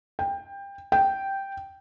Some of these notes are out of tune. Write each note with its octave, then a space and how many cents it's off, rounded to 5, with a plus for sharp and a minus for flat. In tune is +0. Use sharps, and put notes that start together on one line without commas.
G5 +20
G5 -5